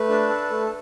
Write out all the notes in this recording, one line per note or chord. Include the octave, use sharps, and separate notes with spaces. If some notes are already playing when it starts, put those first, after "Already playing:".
Already playing: A3 B4
D4
A4
A3